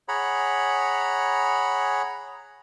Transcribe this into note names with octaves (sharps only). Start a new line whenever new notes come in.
G#4 C#5 F#5 A#5 B5